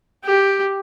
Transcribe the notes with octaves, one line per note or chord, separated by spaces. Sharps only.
G4